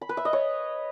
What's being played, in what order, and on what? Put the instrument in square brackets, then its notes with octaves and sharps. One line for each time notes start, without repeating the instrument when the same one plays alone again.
[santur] B5
B4
E5
D#5
C#5